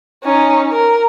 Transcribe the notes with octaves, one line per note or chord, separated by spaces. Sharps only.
C#4 D#4
A#4